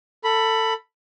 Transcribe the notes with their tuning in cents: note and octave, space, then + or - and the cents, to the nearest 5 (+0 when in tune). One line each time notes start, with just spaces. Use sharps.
A4 +20 B5 +0